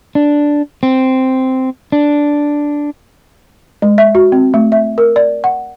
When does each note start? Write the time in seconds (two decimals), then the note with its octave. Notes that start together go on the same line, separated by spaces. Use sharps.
0.15 D4
0.83 C4
1.92 D4
3.82 G#3
3.98 E5
4.15 F#4
4.32 C4
4.54 A3
4.72 E5
4.98 A#4
5.16 D5
5.44 F#5